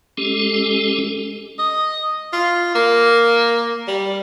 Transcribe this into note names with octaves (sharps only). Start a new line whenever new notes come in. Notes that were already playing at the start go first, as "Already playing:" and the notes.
G#3 C#4 G4 A4
D#5
F4
A#3
G3